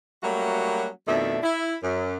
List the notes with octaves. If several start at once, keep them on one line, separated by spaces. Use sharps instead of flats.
F#3 G3 A3 A#3 C#4 F#4
F2 B2 D#3 A3 D4 E5
E4
F#2